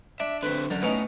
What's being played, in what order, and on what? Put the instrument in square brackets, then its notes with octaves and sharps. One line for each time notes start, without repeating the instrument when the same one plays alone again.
[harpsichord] D4 [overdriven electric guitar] E5
[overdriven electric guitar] D3 C4 [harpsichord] B4 B5
[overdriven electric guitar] F#2 [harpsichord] D3
[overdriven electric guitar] A2 [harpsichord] B3 C#4 D#4